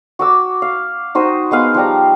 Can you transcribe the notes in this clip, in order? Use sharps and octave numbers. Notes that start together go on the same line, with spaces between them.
F#4 D6 E6
F5
D#4 F#4 C5 D#5
G#3 B3 F5
F3 G3 A#5